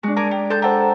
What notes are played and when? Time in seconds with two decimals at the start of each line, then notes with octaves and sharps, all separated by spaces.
0.03 G#3 D4 F#4
0.17 A#4 G#5 A5 D6
0.31 G4
0.50 A4 A5 C6 G6
0.62 G4 A4 C5 F#5 A#5